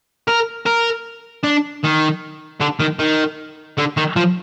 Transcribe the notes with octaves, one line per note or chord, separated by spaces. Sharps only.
A#4
A#4
D4
D#3
D3
D#3
D#3
D3
D#3
F3